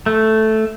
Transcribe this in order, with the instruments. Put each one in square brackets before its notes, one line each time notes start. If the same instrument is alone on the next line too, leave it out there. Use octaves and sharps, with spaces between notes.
[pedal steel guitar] A3